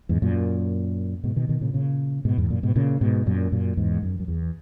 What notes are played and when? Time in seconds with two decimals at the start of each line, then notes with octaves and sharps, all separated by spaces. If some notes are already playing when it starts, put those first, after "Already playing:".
0.09 E2 G#2
0.22 F#2 A#2
1.24 G#2 B2
1.36 B2 D#3
1.49 B2 D#3
1.61 A#2 C#3
1.74 A#2 C#3
2.25 G#2 B2
2.38 E2 G#2
2.50 F#2 A#2
2.63 G#2 B2
2.76 A#2 C#3
3.01 G#2 B2
3.26 F#2 A#2
3.52 F#2 A#2
3.77 E2 G#2
4.03 F#2
4.20 F#2
4.28 E2